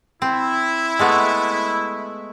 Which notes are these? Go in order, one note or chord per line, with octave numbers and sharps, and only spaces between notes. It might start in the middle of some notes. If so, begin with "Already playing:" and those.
C4 E4
G#3 A3 B3